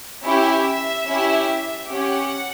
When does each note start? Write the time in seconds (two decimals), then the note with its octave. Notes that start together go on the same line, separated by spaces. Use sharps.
0.25 C#4 E4 G4 E5
1.08 C#4 E4 G4
1.90 C#4 G4 F#5